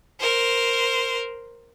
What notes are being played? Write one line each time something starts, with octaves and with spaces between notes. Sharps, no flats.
A#4 C5